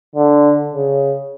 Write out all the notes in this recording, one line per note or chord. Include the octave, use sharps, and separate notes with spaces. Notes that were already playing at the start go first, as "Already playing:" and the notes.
D3
C#3